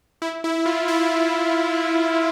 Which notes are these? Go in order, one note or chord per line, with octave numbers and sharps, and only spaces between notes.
E4
E4
F4
E4